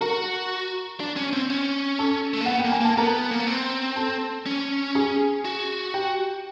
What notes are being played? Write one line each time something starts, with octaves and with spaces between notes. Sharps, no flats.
F#4 A#4 A#5
D4
C#4
C4
C#4
A4 A5
A3
A#3
B3 F#5
G5
A#3
G#5
A#3 A5
B3 A#4 A#5
A#3
B3
C4
A4 A5
C#4
G#4 G#5
F#4
G4 G5